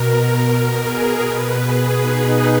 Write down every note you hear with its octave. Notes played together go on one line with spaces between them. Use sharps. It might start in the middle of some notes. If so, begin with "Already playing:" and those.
Already playing: B2 A#4
G#4
B2 B4
G#4
D#4